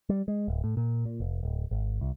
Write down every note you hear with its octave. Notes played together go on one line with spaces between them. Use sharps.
G3
G#3
D1
A2
A#2
A#2
F1
D1
G#1
C2